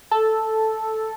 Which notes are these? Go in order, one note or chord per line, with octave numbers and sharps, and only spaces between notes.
A4